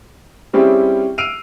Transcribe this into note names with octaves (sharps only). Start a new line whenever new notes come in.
G3 C4 C#4 E4 G4 G#4
E6 F6 C7 D7 D#7 F7